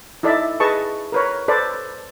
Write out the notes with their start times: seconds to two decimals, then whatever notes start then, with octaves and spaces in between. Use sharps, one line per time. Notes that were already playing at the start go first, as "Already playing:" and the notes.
0.23 D#4 E4 A4 D5 E5
0.60 G#4 B4 D#5 A5 C#6
1.12 A#4 B4 C#5
1.48 A4 B4 C5 D5